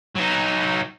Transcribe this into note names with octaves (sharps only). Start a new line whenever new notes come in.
F#3 D#4